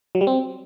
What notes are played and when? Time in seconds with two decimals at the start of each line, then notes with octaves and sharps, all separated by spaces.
0.15 F#3
0.21 G3
0.27 C4